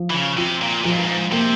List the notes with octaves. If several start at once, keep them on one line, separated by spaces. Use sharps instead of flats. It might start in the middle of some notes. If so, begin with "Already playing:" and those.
Already playing: F3
E3
C#3
C3 F4
A#2
A#2 F3
G#2
G2
G#2
C3 A#3